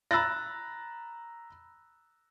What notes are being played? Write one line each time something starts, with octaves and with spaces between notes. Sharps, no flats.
A#5 B5 E6 F#6 A6 A#6